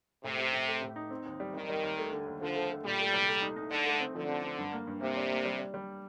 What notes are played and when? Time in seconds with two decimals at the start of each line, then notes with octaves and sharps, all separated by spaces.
0.24 A2 C3
0.38 G4
0.53 A2
0.68 A3
0.82 A2
0.96 D#4
1.11 C4
1.25 D#2
1.40 G3
1.55 D#3 G3
1.69 G3
1.83 D#2
1.98 A3
2.12 D3
2.27 D#2
2.41 D3 F3
2.56 A3
2.70 A3
2.84 A#2 G3
3.00 A3
3.13 C2
3.28 A3
3.42 D#4
3.56 D#4
3.71 D3 A3
3.86 A3
4.00 C4
4.15 D3 F3
4.29 C4
4.43 C4
4.58 G2
4.72 A#3
4.87 G2
5.01 C3 A#3
5.16 D4
5.31 A#3
5.45 G3
5.59 G3
5.74 G3